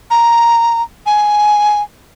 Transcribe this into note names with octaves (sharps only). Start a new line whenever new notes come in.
A#5
G#5